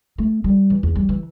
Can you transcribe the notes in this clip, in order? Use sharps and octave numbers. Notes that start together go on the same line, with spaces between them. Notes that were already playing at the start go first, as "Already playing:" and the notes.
A3
G3
E3
E2
G3
E3